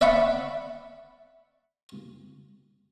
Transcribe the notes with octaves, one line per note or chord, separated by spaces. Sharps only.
D5 E5 F#5 B5 C#6 D6